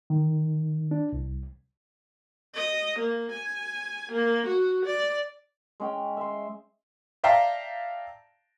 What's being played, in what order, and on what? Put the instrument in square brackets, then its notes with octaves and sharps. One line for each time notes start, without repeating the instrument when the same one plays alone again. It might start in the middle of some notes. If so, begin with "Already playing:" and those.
[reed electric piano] D#3
D4
C2
[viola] D#5
A#3
G#5
A#3
F#4
D5
[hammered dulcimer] G#3 C#4 G5
E5 C6
[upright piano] D5 E5 F5 G5 A5 A#5